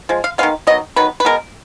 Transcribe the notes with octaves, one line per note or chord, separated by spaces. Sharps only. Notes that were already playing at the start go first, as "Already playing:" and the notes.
F3 G#3
F5
D#3 G#3 B3 F5
D#3 F#3 B3 D#5
D#3 F#3 B3 B4
B4
B2 G#3 B3 A#4